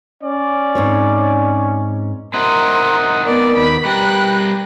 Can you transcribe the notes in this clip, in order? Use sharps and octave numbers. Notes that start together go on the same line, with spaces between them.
C#4 D5
G#2 C4 C#5
C4 D#4 E4 A#4 D#5 F#5 C6
B3 A#4 D5
D#2 B5 D6
G3 A#4 B4 G5 F#6